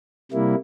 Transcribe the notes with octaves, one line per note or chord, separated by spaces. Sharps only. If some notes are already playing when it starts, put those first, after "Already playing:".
C3 G3 A#3 E4